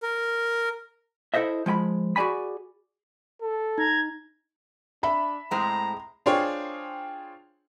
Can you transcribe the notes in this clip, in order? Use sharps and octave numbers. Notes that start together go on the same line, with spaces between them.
A#4
E4 A4 C5 D#5 E5
F3 G#3 G5 B5
F#4 G#4 D5 G#5 B5
A4
D#4 A#5 G#6
D4 E5 B5
A2 G#3 C4 A#5
D4 F4 G#4 C5 C#5 G5